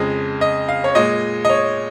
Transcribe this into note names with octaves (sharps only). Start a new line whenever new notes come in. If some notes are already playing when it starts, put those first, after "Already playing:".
Already playing: F2 C#3 G#3 D#5
D#5
F5
C#5
A#2 G#3 D#5
D#5
C#5